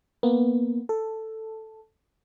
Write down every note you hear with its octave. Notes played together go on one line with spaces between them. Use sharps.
A#3 B3
A4